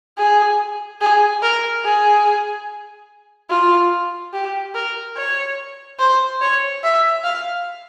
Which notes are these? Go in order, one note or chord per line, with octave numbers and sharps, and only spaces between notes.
G#4
G#4
A#4
G#4
F4
G4
A#4
C#5
C5
C#5
E5
F5